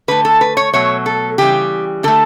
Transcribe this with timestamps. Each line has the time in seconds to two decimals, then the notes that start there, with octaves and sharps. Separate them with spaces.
0.08 D3 A3 B4
0.25 A4
0.41 B4
0.57 C#5
0.73 B2 F#3 A3 C#5
1.06 A4
1.38 C#3 E3 G3 G4
2.03 D3 A3 A4